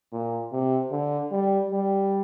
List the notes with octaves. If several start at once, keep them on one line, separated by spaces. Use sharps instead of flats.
A#2
C3
D3
G3
G3